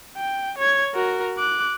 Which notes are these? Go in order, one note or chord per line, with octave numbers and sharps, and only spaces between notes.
G5
C#5 G#6
F#4 A#4
D6 F#6